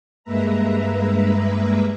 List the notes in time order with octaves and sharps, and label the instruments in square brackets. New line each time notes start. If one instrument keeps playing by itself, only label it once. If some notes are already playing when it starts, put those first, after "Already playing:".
[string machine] G2 G#3 A#3 B4 E5 A#5